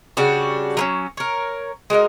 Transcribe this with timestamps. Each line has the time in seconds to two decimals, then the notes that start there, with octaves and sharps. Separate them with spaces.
0.17 C#3 G3 D4 F#4
0.77 F#3 A#3 C#4
1.17 A#4 C#5
1.90 G#3 F#4 A#4 D#5